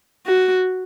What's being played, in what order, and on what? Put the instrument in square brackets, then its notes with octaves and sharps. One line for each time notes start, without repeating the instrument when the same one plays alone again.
[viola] F#4